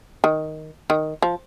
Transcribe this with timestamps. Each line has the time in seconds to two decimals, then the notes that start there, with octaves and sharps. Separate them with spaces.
0.24 D#3
0.90 D#3
1.22 F3